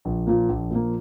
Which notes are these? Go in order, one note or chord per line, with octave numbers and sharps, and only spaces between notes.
A#1
A#2 F3 A#3
A#1
A#2 F3 A#3